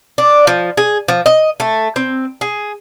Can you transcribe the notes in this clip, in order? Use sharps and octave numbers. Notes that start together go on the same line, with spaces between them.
D4
F3
G#4
F3
D#5
A3
C4
G#4